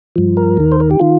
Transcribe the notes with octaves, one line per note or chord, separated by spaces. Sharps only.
G2 F3
A#4
D#2 D#3
C5
A#4
G4
D#3 F4